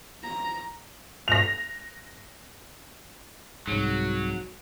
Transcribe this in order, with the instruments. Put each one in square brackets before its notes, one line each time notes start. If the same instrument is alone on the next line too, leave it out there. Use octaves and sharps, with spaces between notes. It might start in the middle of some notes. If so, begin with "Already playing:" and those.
[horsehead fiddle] A#5
[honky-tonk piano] A#6 F7
[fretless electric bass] C2 G#2 [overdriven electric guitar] F#3